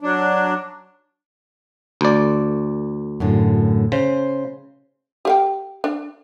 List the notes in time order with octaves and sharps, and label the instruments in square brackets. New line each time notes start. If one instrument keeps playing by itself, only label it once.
[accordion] F#3 D4
[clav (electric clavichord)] D2 D5
[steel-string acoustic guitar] F#2 A2 D3
[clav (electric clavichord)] C#3 [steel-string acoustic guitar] C5
[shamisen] G4 F5 G5
D4